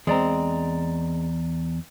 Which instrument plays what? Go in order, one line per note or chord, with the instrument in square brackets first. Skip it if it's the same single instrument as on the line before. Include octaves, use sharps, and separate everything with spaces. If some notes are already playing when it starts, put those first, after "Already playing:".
[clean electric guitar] E2 D5 A#5 [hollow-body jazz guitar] G#3 C4